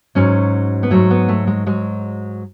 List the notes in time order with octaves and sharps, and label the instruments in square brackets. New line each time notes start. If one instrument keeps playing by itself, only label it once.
[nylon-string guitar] G#2 F#3 C#4
B3
G#2 F#3 A3
B3
A3
G#3
G#2 F#3 G#3